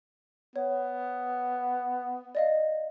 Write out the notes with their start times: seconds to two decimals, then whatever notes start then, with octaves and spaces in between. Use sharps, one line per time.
0.56 B3 C#5
2.35 D5 D#5 F5